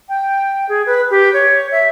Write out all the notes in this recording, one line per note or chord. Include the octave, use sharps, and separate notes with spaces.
G5
G#4
B4
G4
C#5
E5